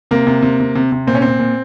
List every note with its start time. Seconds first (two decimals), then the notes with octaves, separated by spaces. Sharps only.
0.11 C3 A#3
0.27 C3
0.42 C3
0.60 C3
0.75 C3
0.92 C3
1.07 A#2 C4
1.15 C#4
1.22 A#2 C4
1.39 A#2